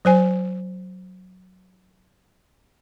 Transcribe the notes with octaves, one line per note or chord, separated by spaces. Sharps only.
F#3 C5 G#5